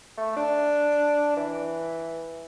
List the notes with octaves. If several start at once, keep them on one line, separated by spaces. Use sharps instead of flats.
A3
D4
E3